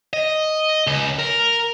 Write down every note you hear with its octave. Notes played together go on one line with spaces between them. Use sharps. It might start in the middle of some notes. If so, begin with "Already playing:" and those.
D#5
C#2
A#4